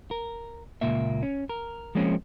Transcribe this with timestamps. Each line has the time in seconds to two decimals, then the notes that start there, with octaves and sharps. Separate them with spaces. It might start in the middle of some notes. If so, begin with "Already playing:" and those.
0.11 A#4
0.81 C#2 A#2 A#3 E5
1.23 C#4
1.49 A#4
1.95 F3 G#3 A#3 C4 C#4